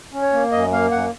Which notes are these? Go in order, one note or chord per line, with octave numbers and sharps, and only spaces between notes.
C#4
C#5
A#3
F#2 D#5
A#3 F5
F#2 F#5